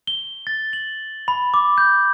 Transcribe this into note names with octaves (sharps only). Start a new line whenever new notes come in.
G7
A6
F#7
B5
D6
G6